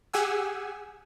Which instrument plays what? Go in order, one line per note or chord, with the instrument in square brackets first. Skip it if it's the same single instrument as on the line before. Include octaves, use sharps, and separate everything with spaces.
[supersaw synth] G4 G#4 F#5 G#5 E6